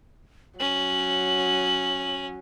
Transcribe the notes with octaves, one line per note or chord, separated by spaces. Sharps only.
F#3 C#4 F#7